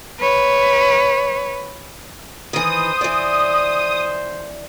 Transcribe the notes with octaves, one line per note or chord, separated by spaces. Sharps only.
B4 C#5
D#3 E3 C5 D#6
E3 D5